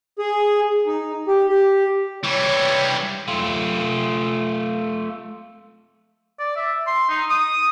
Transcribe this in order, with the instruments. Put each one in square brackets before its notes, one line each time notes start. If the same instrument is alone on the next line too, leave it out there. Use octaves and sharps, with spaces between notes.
[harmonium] G#4
D#4
G4
G4
[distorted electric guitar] E3 G3 [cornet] C#5
[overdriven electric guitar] A3 F4
[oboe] D5
E5
C6
D#4
D#6